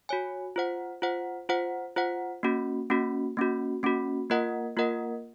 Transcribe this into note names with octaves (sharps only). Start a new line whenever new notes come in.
F#4 C#5 G#5
F4 C5 F#5
F4 C5 F#5
F4 C5 F#5
F4 C5 F#5
A#3 C#4 F#4
A#3 C#4 F#4
A#3 C#4 F#4
A#3 C#4 F#4
A#3 F4 A#4 D#5 F#5
A#3 F4 A#4 D#5 F#5